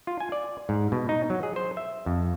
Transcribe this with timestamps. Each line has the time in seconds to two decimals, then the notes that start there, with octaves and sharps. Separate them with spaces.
0.07 F4
0.20 G#5
0.32 D5
0.69 G#2
0.92 B2
1.09 D#4
1.30 F#3
1.43 G#4
1.56 C5
1.77 E5
2.06 F2